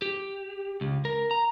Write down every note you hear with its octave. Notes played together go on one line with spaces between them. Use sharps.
G4
C#2
A#4
A#5